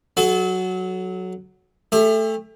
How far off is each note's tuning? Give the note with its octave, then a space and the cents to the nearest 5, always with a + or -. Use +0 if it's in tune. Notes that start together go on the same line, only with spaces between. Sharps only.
F#3 +0 A4 -35
A3 +0 G4 +40